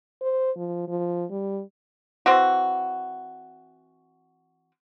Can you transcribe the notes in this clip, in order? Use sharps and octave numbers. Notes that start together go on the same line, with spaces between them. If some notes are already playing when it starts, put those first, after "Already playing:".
C5
F3
F3
G3
E3 C4 F#4